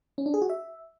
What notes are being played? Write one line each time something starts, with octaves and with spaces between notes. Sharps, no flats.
C#4
D4
G#4
F#4
E5